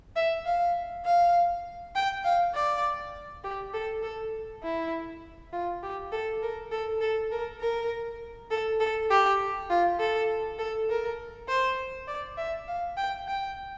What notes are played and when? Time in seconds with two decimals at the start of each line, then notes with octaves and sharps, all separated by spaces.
0.16 E5
0.45 F5
1.05 F5
1.95 G5
2.25 F5
2.54 D5
3.44 G4
3.73 A4
4.03 A4
4.63 E4
5.53 F4
5.83 G4
6.12 A4
6.42 A#4
6.71 A4
7.01 A4
7.31 A#4
7.60 A#4
8.51 A4
8.80 A4
9.10 G4
9.70 F4
10.00 A4
10.58 A4
10.89 A#4
11.48 C5
12.08 D5
12.37 E5
12.68 F5
12.97 G5
13.28 G5